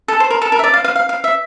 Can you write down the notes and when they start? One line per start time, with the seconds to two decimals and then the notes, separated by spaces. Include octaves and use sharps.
0.08 A4
0.20 C5
0.30 A#4
0.42 A4
0.52 A#4
0.59 E5
0.64 D5
0.74 F5
0.84 F5
0.96 F5
1.09 F5
1.24 E5